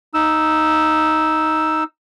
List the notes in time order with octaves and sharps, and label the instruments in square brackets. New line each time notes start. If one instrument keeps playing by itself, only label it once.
[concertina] D#4 E6